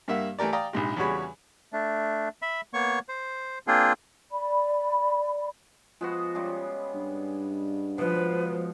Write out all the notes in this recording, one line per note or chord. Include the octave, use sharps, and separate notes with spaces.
G2 A#3 E5 F#5
E3 A3 G4 A#4 D5
D5 F5 G5 A#5 D#6
A#1 G#2 C3
E2 C#3 G3 F#4 C#5 B5
A3 D4
E5 B5
A#3 B3 C#5 C#6
C5
A#3 C4 D4 F4 G#4
D5 B5
F3 G#3 B3 F#4
C#3 G3 G#3
G2
G#2 B2 F3 B4